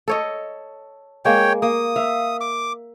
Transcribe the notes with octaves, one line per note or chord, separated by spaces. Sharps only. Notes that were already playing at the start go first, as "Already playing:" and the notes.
A4 C#5 D#5
G#3 A#3 C#5 G5
A#3 D#6
E5 F5
D6